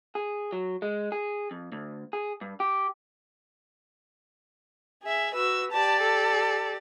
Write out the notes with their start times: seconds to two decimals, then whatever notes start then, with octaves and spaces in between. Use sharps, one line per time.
0.15 G#4
0.53 F#3
0.82 G#3
1.12 G#4
1.51 F2
1.72 D2
2.13 G#4
2.41 G2
2.60 G4
5.02 G#4 E5
5.35 F#4 B4 E6
5.72 G4 D5 A5
6.00 A4